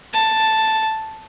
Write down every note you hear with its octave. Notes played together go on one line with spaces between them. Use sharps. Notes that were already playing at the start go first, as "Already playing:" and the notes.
A5